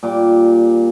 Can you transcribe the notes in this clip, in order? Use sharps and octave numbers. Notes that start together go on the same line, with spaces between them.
A#2 G3 G5 D6